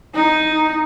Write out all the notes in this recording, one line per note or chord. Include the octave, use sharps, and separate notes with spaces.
D#4